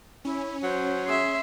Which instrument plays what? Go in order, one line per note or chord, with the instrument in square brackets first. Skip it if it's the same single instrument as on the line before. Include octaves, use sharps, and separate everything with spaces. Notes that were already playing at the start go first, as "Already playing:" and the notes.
[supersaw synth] C#4 [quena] E4
[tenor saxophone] F#3 [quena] C5
[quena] G#4 [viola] E5 C6